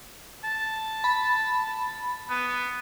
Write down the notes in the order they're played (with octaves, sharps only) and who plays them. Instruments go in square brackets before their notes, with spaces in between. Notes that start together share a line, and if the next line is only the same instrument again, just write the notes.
[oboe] A5
[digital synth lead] B5
[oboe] B3